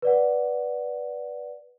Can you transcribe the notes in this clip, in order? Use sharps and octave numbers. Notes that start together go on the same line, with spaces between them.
B4 D5 F#5